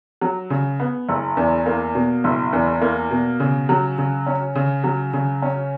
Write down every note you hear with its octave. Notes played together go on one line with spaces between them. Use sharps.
F#3
C#3
B3
F#1
E2
A#3
B2
F#1
E2
A#3
B2
C#3
F#3
C#3
C#4
C#3
F#3
C#3
C#4